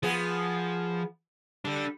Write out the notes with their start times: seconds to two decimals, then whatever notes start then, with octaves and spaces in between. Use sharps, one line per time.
0.03 F3 B3 G#4
1.65 G3 D4 A4